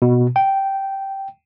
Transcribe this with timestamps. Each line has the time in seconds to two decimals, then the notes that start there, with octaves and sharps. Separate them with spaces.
0.02 B2
0.36 G5